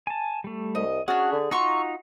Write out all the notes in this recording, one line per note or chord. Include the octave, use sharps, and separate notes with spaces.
G#5 A5
G3 A3
C2 D#5
C#4 D4 F#4 G#4
D3
D#4 F4 F#4 A#5 C6 C#6 E6